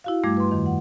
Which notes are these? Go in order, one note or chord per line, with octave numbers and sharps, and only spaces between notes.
E4 F#4 F5
G2 G3 A3 D6 G#6
B4 C6
F2 D#3
F#5